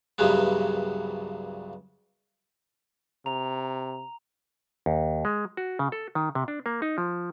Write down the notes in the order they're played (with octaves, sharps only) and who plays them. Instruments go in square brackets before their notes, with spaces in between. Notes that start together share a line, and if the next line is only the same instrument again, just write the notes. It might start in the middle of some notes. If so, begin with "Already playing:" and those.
[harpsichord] C2 G2 A#2 C#3 F#3 B3
[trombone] C3 [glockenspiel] A#5 F7
[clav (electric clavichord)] D#2
G#3
F#4
C#3
A4
D#3
C3
D4
A#3
D#4
F3